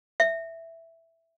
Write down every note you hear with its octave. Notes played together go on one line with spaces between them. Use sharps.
E5